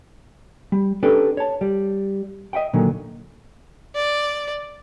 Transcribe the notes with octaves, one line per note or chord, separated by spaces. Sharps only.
G3
C#4 D4 G4 A4 B4
C#5 A5
G3
D#5 E5 F#5 G5
A#2 D3 D#3 F#3
D5